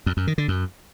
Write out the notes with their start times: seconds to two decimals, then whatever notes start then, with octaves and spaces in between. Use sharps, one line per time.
0.06 F2
0.17 F#2
0.27 D#3
0.38 D3
0.48 F#2